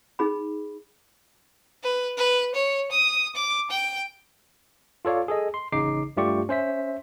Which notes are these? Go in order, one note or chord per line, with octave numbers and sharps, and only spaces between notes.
D#4 G#4 B5
B4
B4
C#5
D#6
D6
G5
F4 A4 C#5 D5 F5
G#4 A4 D#5
C6
A1 C#3 D#4 D6 C7
G2 A3 F4 G4 D5 C#6
C#4 C5 E5 B6